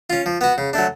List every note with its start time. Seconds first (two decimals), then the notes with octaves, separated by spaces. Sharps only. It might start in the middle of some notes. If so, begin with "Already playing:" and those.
0.10 C#4 F4
0.26 F3
0.41 B3 F#4
0.58 C#3
0.73 F#3 A3 D4